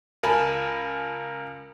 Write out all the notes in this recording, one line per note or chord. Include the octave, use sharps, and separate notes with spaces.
C#2 A#4 G#5 A5 B5 E7